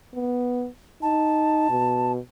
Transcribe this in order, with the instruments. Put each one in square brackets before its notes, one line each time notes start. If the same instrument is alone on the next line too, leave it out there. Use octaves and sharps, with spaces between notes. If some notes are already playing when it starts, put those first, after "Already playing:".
[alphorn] B3
[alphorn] D#4 [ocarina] A5
[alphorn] B2